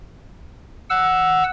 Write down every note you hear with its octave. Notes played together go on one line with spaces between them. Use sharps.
F#5 E6